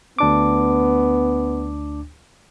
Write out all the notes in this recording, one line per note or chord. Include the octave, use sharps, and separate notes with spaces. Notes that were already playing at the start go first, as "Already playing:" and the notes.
D2 B3 D4 D6